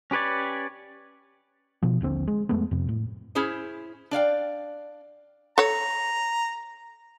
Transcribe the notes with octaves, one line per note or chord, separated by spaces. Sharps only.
C#4 G4 B4 C#5 D5
B2 F3
D#1 A#1 D3 C4
G#3
F2 G#3 A3 B3
F2 C3
A2
C#4 E4 G#4 C5
D4 D5 F5 G5
A4 C#5 A#5